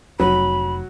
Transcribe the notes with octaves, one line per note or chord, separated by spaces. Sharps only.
F1 F2 F#3 B5